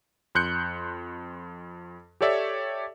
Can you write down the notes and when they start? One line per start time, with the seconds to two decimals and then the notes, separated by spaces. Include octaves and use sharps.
0.35 F2 C6 F#6 G6 C#7
2.21 G4 A4 C#5 D5 E5